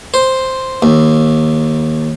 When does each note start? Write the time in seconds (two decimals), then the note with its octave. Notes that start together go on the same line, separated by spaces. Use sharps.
0.14 C5
0.82 D#2